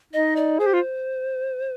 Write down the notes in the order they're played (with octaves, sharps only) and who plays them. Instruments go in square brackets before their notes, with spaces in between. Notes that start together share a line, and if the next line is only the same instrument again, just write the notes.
[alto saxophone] D#4 [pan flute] D#5
[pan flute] D5
[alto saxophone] G#4 [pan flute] C5
[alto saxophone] G4
F4